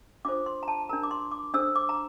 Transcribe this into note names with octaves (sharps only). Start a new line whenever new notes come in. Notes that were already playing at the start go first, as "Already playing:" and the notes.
D4 F4 A4 C5 D6
C6
A#5
A5
D4 G4 A#4 A#5
D6
C6
D6
D4 A4 C5 E6
D6
A#5